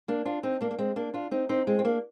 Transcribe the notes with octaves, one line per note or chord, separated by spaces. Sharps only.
A#3 D4
D4 F4
C4 D#4
A#3 D4
A#3
G#3 C4
A#3 D4
D4 F4
C4 D#4
C4 D#4
G#3 C4
C4
A#3 D4